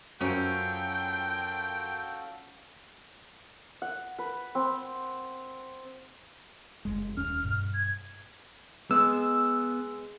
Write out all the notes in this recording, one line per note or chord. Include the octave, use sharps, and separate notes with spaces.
F#2 C#4 F4 F#4 A4 C5 G5 D7
F#5
B4
C4
F1 F2 G#3
D#1 C#4 F6
G2 B2
G#6
G#3 B3 E6